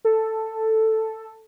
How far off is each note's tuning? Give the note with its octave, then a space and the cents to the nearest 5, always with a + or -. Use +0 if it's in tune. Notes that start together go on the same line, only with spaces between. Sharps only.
A4 +5